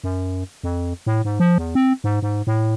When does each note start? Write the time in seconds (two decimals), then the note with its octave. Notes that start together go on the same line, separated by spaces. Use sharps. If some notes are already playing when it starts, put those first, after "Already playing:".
0.04 F#2
0.64 F2
1.06 A2
1.25 G#2
1.40 F3
1.58 E2
1.75 C4
2.04 G#2
2.22 G#2
2.47 A2